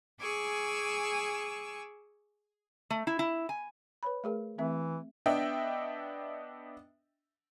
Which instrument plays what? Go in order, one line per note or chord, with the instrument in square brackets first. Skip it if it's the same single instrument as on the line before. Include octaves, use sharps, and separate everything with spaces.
[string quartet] G#4 G#5 C#6 D6 E6
[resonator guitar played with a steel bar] A3
E4
E4
G#5
[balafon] B4 C#5 B5
A3 G#4 A#4
[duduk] E3 [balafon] A3 C4 E5
[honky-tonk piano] B3 D4 D#5 E5 G5